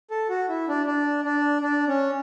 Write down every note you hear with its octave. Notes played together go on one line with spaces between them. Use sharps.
A4
F#4
E4
D4
D4
D4
D4
C#4